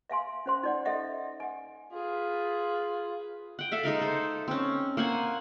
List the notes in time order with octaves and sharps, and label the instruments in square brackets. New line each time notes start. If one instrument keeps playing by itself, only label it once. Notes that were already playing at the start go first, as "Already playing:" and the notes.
[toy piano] E5 F5 G#5 C6
C#4 C5 C6
D#4 D5 F#5
A4 D#5 E5 F#5
F#5 G#5
[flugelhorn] F4 [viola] G#4 B4
[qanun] F#5 G5
A4 E5 F5
G#3 D#4 A#4 F5
A4 C5
C4 C#4
A#3 C5 F#5 G#5